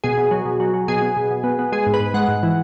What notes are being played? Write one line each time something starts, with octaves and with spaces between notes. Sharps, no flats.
B2 G#4
B2
F#3
B2
F#3
F#3
B2 G#4
B3
B2
B2
B3
B3
G#3 G#4
G#2
B4
G#2
G#3 F#5
G#2
E3